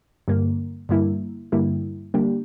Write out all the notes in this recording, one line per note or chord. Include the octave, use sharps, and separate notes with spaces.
G2 D3 G3 A#3
G2 D3 G3 A#3 E4
G2 D3 G3 A#3 E4
D3 G3 A#3 D4 G4